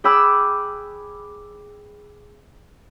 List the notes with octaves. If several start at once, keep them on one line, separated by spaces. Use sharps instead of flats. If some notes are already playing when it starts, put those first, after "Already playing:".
G#4 G5 B5 D6 E6 F#6